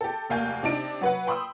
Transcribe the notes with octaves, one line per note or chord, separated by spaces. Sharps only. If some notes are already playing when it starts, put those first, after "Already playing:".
G4 A4
F1 D#2 A#3 F5 G#5 G6
C3 D4 D#4 D7
F#3 B4 F#5
G5 B5 C6 D#6 E6